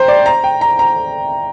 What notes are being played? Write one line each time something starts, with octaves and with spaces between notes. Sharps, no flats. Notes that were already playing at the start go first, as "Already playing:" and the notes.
Already playing: C5 G5 A#5
D5
A#5
G5
A#5
A#5